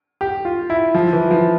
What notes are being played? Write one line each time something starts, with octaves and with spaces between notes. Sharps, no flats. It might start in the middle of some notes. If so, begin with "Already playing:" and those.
G4
F4
E4
F3
E3
F3